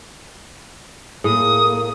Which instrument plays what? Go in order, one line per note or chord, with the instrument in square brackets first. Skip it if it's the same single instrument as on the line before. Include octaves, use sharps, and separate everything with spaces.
[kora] A2 [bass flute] A#3 [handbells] G#4 [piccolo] D#6